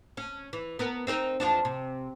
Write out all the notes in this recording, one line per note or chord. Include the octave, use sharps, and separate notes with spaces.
C#4
E3
B3 A#4
C4 D#4 A#4
E2 F3 D4
C3